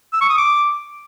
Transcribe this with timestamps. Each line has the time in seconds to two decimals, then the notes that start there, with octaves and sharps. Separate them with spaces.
0.13 E6
0.21 C#6
0.29 D#6
0.38 D6